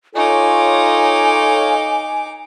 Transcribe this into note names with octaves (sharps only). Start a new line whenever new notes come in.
D#4 F4 A4 C#5 G#5 D6